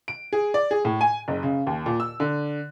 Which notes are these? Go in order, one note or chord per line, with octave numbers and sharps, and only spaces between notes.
D7
G#4
D5
G#4
A2
G#5
F#1
C#3
D#2
A#2
E6
D3